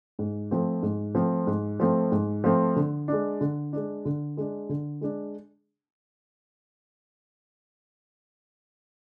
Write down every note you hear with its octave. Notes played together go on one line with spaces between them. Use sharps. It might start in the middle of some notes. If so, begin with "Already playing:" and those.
G#2
F3 A3 C4
G#2
F3 A3 C4
G#2
F3 A3 C4
G#2
F3 A3 C4
D3
G#3 D4
D3
G#3 D4
D3
G#3 D4
D3
G#3 D4